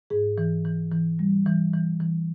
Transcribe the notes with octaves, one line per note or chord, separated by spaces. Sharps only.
G#2 G#4
E3
E3
E3
G3
E3
E3
E3